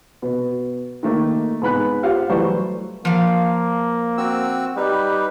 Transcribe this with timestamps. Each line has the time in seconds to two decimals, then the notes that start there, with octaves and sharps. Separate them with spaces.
0.22 B2
1.03 D#3 A3 A#3
1.62 G#2 B3 B5 F#6
2.03 F4 G4 C5 F5 F#5
2.29 E3 F#3 G3 A3 C5 C#6
3.05 F3 A#3 F5
4.18 C4 F#4 E6
4.77 G3 D#4 B4